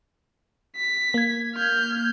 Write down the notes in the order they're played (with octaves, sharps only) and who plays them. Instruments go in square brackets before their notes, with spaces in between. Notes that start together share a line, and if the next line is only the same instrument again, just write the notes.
[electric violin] B6
[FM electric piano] A#3 G#6
[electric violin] F6 G6